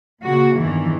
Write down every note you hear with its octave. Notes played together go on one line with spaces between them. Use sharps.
A#2 C#3 F#4
E2 G2 D#3 E3